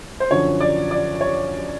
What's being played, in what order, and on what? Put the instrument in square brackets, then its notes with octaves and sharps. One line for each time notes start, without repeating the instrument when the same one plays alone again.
[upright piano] C5
F#2 D3 F3 C#5
D5
D5
C#5